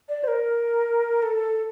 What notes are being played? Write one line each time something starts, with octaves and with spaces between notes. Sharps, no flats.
D5
C5
A#4
A4